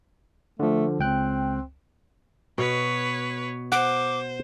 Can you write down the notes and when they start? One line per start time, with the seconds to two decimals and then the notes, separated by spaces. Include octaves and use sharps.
0.60 D3 F3 A3
0.99 C#2 C4 G5 F#6
2.58 B2 B4 C#5
3.72 C5 F#5 D6